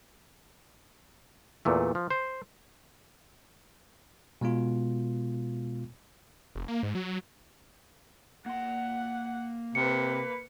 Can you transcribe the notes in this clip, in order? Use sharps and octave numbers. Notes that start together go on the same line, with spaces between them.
E2 A#2 A3
F3
C5
B2 G#3 B3 F4
F1
A#3
G#2
F#3
A#3 F#5 C6
C3 A#3 B4 C#7